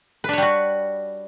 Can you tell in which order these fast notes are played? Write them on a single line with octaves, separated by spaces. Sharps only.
B4 D4 C#5 G3 F#4